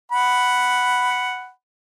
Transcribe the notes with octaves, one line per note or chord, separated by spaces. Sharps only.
F#5 B5